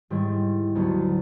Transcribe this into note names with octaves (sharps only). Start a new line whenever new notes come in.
G#2 D#3 G3 B3 E4
D2 D3 F#3 B3 D4